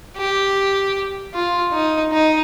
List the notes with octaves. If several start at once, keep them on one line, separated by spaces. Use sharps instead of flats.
G4
F4
D#4
D#4